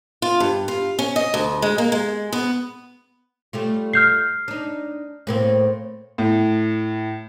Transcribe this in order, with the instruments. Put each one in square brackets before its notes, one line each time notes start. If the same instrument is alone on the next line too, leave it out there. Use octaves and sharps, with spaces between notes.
[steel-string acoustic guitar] F4
G2
F4
C#4
D#5
D2
G#3
A#3
G#3
B3
[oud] G3 A3 F4
[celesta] F6 G6 C7
[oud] D4 D#4
A2 A#3 C4
[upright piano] A2